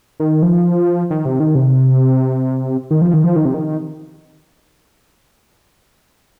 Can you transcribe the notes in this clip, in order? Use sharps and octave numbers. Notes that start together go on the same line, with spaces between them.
D#3
F3
D#3
C3
D#3
C3
D#3
F3
D#3
F3
D#3
C3
D#3